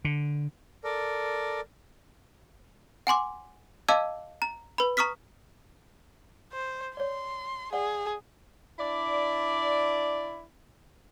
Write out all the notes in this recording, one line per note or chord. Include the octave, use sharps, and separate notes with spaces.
D3
A4 A#4 D5
F#5 G#5 C6 D6
D#5 F5 A5 D6 E6 G#6
A#5
B4 B5
A#5 C#6 D#6 F6 B6
C5
C#5 D5 C6
G#4 D5 F#5
D4 E4 D5